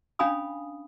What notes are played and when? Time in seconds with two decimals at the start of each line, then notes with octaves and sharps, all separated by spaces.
0.19 C#4 D4 F5 G#5 B5 D#6